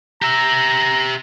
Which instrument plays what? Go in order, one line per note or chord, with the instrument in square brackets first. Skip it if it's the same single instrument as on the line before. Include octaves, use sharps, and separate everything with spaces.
[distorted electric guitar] G4 E5 [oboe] A#5